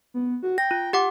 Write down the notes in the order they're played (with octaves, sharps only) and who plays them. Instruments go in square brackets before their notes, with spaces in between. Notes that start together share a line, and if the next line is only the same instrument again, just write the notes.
[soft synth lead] B3
F#4
[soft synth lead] G5 [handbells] A#6
[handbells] F4
G4 F#5 D6